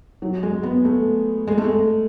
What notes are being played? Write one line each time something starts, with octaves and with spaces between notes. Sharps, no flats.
F#3
G#3
B3
A3
G#3
A3
G#3